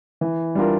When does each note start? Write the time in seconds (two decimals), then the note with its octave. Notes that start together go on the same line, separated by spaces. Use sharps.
0.21 E3
0.55 G3 D4 F4 A#4